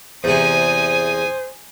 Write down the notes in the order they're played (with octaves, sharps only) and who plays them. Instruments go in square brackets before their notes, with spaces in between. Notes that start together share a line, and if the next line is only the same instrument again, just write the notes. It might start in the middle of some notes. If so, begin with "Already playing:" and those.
[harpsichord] E2 C3 [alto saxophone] C5 [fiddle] G#5 D#6